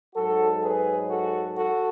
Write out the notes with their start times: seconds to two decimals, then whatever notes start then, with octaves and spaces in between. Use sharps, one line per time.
0.16 G#2 F#3 F#4 A4
0.63 G#4 B4
1.10 F#4 A4
1.57 F#4 A4